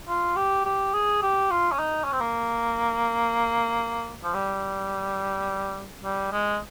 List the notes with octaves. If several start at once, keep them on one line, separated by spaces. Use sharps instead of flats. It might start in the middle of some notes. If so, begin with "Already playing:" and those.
F4
G4
G4
G#4
G4
F4
C#4
D#4
C#4
C4
A#3
F3
G3
G3
G#3